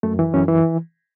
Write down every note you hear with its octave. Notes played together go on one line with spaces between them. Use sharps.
F#2 A3
E3
F#2 C#4
E3